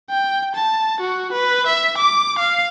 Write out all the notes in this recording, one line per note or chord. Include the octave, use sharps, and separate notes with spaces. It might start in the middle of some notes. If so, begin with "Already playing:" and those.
G5
A5
F#4
B4
E5
D6
F5